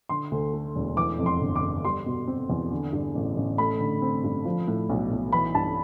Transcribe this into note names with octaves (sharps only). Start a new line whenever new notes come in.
D3 C6
D2
A3
E1
E3 D6
F2
C6
G1
D6
G1
G3 C6
B2
C4
E2
D3
G2
A1
A1
A3 B5
D3
C4
G2
F3
A2
B1
B1
E3 B5
G2 A5